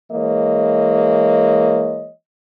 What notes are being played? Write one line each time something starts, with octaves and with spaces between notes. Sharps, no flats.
E3 G#3 A#3 C#5 D#5